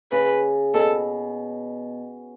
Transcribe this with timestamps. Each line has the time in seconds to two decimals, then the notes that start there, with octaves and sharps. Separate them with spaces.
0.12 C#3 B4
0.74 B2 A4